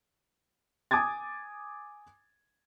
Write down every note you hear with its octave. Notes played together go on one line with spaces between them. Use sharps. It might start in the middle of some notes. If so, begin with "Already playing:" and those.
G#5 D6 D#6 G#6 A6